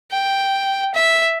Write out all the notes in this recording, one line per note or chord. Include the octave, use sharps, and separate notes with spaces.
G5
E5